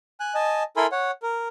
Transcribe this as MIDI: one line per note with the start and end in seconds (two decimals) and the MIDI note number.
0.20 0.34 80
0.20 0.34 90
0.35 0.63 75
0.35 0.63 80
0.35 0.63 81
0.77 0.86 64
0.77 0.86 69
0.77 0.86 70
0.77 0.86 80
0.77 0.86 83
0.77 0.86 84
0.92 1.11 73
0.92 1.11 78
1.23 1.48 70